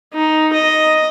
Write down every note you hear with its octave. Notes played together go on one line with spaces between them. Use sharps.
D#4
D#5